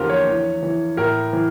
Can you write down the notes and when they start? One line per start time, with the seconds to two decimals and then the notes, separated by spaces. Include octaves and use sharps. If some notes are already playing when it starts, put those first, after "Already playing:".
Already playing: E2 D3 F3 F4 G4 A#4
0.10 C#5
0.27 E3
0.63 E3
0.97 A2 A#4
1.33 E3